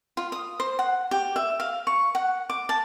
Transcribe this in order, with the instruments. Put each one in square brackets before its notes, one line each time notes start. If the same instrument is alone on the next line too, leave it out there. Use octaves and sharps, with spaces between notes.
[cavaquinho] F4
D#6
C5
F#5
G4
E5
F5
C#6
F#5
D6
A5